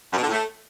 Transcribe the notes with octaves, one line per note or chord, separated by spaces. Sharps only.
F#2
B2
D3
A2
A3